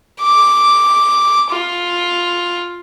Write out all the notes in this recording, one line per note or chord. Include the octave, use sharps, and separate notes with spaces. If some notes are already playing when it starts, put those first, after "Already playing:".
D6
F4